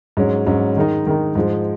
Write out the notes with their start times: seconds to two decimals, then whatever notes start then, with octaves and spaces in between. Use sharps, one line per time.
0.17 G#2 F#3 C#4
0.46 G#2 F#3 C#4
0.77 D#3 G#3 D#4
1.06 D#3 G#3 D#4
1.35 G#2 F3 G#3